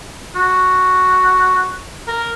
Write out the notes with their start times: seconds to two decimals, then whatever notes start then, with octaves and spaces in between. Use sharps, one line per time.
0.36 F#4
2.08 A#4